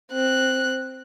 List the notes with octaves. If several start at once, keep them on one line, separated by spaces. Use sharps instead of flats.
C4 F#6